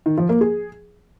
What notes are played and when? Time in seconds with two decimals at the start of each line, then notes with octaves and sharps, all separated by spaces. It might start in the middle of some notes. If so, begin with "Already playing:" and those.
0.06 D#3
0.17 F3
0.29 A#3
0.41 G#4